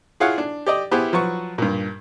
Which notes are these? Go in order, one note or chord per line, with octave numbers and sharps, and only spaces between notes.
E4 F4 G#4 C#5 F5 F#5
D4
G4 D5 D#5
B3 E4 G4 G#4 B4 C5
F3 F#3 B4 C#6
G2 A#2